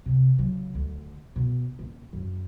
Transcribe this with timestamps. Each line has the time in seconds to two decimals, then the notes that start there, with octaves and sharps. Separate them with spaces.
0.06 C3
0.38 C#3 F#3
0.75 D2
1.36 B2
1.79 D#1
2.13 F#2